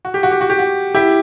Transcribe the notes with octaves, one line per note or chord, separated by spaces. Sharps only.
F#4
G4
F#4
G4
F#4
G4
F#4
E4 G4